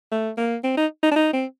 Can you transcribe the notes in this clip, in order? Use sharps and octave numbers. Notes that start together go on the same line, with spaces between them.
A3
A#3
C4
D#4
D#4
D4
D#4
C4